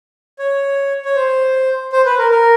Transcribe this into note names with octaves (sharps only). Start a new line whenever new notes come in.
C#5
C#5
C5
C5
B4
A#4
A#4